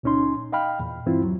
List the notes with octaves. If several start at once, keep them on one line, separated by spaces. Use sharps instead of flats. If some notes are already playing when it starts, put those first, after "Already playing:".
C#2 A#2 C#4 D#4 C6
D#5 F5 G5 B5 F6
E2 A#2
G2 E3 C4 E4 F4
D#2 F#3